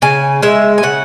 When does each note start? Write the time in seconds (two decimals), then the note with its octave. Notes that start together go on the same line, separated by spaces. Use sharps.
0.02 C#3 G#5
0.42 G#3 E5
0.78 G#5
0.83 C#3 F#5